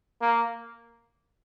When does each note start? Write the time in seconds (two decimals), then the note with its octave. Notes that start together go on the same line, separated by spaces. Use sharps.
0.21 A#3